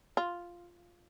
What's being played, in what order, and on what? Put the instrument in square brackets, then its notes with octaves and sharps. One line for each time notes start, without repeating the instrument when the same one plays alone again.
[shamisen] F4